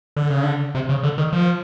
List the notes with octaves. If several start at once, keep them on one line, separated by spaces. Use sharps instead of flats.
D3
C#3
D3
C3
C#3
D3
D#3
F3